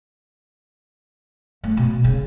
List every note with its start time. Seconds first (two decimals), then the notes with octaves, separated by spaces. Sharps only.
1.64 A3
1.77 B2
2.04 C#3 A#3